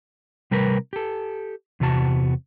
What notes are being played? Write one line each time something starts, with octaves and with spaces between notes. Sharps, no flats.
C3 G3 A#4 B4
G4 A4
E2 C3 F#4 A5